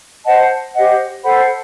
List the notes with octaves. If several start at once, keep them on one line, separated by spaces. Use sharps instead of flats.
C5 D#5 F#5 A5
G4 C5 D#5 F#5
A4 C5 F#5 B5